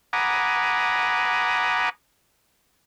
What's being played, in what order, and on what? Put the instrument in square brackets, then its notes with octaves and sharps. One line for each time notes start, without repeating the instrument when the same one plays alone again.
[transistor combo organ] F#5 G#5 A#5 B5 D6 D#6